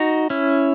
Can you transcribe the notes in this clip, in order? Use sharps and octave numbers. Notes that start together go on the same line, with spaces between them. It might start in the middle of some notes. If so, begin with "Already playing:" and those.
Already playing: D#4 F#4
C#4 E4